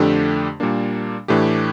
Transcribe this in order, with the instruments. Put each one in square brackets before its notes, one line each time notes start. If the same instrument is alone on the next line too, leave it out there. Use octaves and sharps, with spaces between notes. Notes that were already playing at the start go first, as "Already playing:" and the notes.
Already playing: [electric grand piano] F2 D3 A3 D4 G4
A#2 G3 A#3 D4
A2 E3 A3 D4 G4